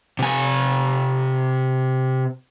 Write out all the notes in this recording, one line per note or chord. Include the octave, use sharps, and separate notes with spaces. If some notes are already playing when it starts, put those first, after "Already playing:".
C3 G#5